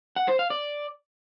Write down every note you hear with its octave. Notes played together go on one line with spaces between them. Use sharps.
F#5
C5
F5
D5